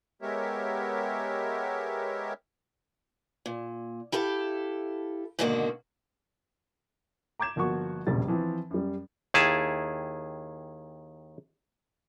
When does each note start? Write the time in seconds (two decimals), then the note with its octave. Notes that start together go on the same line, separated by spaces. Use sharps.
0.22 G#3 B3 G4 A#4 C#5 E5
3.46 A#2
4.12 E4 G4 A4 F5
5.39 G#2 B2 D3 D#3 A#3 F#4
7.39 A#5 D6 G6 G#6 E7
7.56 G1 F3 A#3 F#4 C#6
8.07 E1 A#1 C#3 G3 A6
8.28 E3 F3 C4
8.71 F#2 G3
9.34 D#2 D#3 E4 G#4 A5